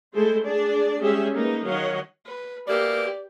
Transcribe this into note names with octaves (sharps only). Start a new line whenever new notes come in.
G#3 A3 E4 A4 C5
D4 G#4 D5
G3 G#3 C#4 G4 G#4 E5
A#3 D#4 B4
D#3 F#3 C#5 D#5 F5 F#5
B4
B2 E3 A#3 G4 D5